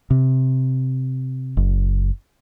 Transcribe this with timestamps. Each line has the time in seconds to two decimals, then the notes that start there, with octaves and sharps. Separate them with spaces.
0.10 C3
1.57 F#1